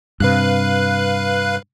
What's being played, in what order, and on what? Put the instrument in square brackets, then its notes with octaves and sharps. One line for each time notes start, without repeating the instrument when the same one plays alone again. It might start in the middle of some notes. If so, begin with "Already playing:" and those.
[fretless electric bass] G2 C3 [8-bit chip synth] B4 F5 F#6